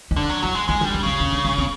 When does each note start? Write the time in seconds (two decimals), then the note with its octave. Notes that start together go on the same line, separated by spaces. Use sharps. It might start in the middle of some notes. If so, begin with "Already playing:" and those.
0.11 D#4
0.16 D3 D4
0.29 F#3
0.42 F#3 E4
0.55 G#3
0.68 G#3 D#4
0.81 D4
0.85 G3
0.94 C#4
1.03 C#3 D4
1.20 D4
1.32 D4
1.45 D#4
1.58 C4